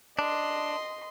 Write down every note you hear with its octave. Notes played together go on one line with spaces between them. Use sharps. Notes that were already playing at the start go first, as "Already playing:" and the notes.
D4 D#5 C6